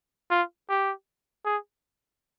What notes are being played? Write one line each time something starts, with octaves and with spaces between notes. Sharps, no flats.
F4
G4
G#4